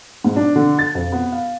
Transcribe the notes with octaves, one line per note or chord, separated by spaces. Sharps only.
G#2
D4
D3
A6
F2
B3
F5